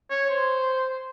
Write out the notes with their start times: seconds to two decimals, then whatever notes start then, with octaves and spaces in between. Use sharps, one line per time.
0.11 C#5
0.30 C5